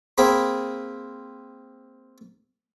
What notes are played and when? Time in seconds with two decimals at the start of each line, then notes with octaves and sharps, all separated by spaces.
0.18 A#3 C4 G#4 B5